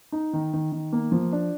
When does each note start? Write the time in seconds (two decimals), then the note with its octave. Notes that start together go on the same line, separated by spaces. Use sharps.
0.12 D#4
0.33 D#3
0.53 D#3
0.72 D#3
0.92 A#3
1.12 F3
1.32 D4